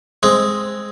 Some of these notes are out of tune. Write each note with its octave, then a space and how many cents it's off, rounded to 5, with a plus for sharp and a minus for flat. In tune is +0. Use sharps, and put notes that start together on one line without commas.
G#3 +0 C4 +0